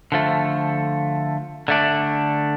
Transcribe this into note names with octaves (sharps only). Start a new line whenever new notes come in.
D3 F3 A3
D3 A3 D4